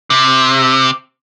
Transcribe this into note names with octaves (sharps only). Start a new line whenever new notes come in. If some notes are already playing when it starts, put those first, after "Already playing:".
C3